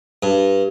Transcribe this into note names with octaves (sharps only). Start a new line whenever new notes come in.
G2